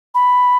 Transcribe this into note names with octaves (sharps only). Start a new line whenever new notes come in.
B5